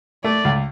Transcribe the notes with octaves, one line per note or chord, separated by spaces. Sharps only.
A3 D5
C#2